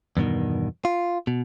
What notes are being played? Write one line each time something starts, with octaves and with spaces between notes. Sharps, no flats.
E2 G2 B2 D#3
F4
B2